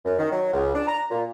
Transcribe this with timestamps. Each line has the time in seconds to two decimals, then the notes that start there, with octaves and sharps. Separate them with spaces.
0.05 F#2
0.19 D#3
0.32 F#3
0.53 C#2
0.74 D4
0.87 A#5
1.11 A#2